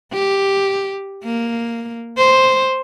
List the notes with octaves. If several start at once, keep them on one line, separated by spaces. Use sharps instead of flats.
G4
A#3
C5